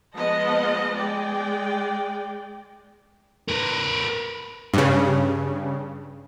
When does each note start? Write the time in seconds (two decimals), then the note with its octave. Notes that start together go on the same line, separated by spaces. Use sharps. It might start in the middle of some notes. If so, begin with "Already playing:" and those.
0.16 F3 G#3 B3 D#5 A5
0.96 G#3 D5 G5
3.48 A#4 B4
4.74 G2 C#3